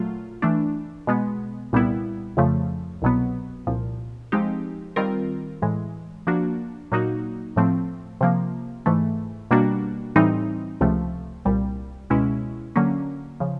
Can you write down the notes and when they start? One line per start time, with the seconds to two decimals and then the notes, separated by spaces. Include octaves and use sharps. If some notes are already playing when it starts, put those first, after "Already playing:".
Already playing: A#2 F#3 A3 F4
0.42 E3 A3 D4
1.07 B2 G#3 B3
1.73 C2 A#2 G3 B3 E4
2.37 F2 C#3 F3 A3
3.02 C2 B2 F#3 B3
3.67 C2 A#2 F3
4.32 F3 G#3 C4 D#4 G4
4.96 D#3 G3 C4 F4 A#4
5.62 A2 E3 G#3
6.27 F3 A#3 D4 F#4
6.92 A#2 F#3 A#3 D#4 F#4
7.56 A2 F3 A3 C4
8.21 C3 F3 A#3
8.86 G#2 E3 A3
9.51 B2 G3 A#3 D4 F#4
10.16 A2 E3 G3 C4 D#4
10.81 C#2 C3 F3 A3
11.45 C2 A#2 G3
12.10 C#2 B2 G#3 C#4 E4
12.76 D3 F#3 A#3 C#4
13.40 C#3 F3